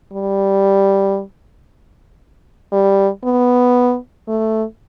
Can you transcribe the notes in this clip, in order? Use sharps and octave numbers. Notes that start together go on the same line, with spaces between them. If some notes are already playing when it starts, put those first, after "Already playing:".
G3
G3
B3
A3